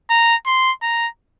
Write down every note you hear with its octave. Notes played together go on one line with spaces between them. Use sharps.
A#5
C6
A#5